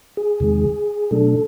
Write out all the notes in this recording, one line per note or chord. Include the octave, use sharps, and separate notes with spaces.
G#4
E2 C3 D#3 G#3
B2 F#3 A3 D4 A4